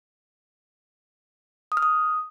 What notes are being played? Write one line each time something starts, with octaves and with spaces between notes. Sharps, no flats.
D#6
F6
D#6